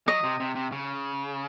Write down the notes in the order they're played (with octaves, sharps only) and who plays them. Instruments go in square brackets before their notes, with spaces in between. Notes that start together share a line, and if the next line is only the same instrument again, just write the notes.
[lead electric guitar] F#3 [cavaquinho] D#5
[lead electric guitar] C3
C3
C3
C#3